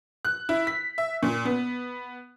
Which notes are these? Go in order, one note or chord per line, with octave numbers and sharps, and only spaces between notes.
F#6
E4
B6
E5
A#2
B3